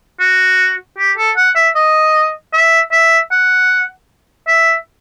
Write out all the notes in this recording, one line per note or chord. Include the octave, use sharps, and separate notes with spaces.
F#4
G4
A4
F#5
E5
D#5
E5
E5
F#5
E5